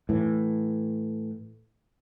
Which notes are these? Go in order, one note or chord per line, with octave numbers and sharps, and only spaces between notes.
A2 E3